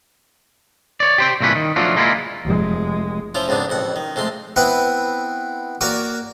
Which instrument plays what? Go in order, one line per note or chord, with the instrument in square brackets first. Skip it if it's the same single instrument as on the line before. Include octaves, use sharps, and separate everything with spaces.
[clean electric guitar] C#5 D5
G4 C5 G5
C2 A#2 A3 C#4 B4
D#3
F3 F#3 A3 D4 F4
G#3 A#3 D4 E4 F4
[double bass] F1 G#3
[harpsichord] F3 C#4 E4 F4
F2 G#2 C#3 B3 D4
A1 F2 F#5
D#3
F2 G#3 A3 C6
B3 C4 E4 B4
A#3 F#4 C#5 D5